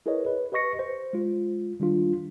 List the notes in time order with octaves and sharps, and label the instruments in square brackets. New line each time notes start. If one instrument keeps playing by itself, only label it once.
[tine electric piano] E4 G#4 A#4 B4 C#5 D#5
B4
G4 B4 D#5 C#6 A#6 C#7
C5
G#3 F4
D#3 G3 D4 F4